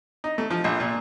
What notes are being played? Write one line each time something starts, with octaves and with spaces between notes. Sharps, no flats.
D#4
A3
F3
A#1
A#2